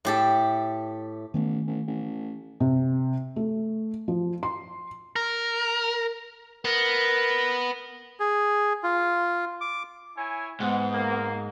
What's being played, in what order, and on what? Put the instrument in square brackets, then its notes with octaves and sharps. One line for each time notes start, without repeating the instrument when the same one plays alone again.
[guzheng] A2 G4 A4
[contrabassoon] A1 [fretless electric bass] D#3 A3 B3
[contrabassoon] A1
A1
[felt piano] C3
A3
F3
C6
[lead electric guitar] A#4
[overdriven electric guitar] B3 [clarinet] A#4
[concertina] G#4
F4
D6
[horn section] E4 C#5 G#5
[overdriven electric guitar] G#2 [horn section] G3 G#3 F#5 [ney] B3
[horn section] A#3